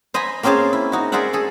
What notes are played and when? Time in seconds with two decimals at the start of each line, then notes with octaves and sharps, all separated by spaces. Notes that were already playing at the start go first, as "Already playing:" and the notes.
0.14 C5 D#5 G#5 A#5 B5
0.43 A#3 C4 C#4 G#4 C5 A5
0.73 E4
0.92 D#4 F#4
1.12 G#4 A#4 C5 D5 E5 F#5
1.33 G#4 A4